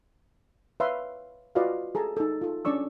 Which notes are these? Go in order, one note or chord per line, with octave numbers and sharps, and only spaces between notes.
B4 C#5 E5 F5 C6
F4 F#4 B4 D5 D#5 F5
G#4 A4 A5 A#5
D#4 A4
F4 A4
C#4 D4 D5 C#6 E6